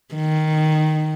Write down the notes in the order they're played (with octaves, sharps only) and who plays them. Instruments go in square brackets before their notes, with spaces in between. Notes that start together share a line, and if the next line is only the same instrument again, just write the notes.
[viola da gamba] D#3